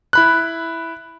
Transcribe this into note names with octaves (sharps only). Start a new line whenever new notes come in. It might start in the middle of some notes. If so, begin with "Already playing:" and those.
E4 B5 F#6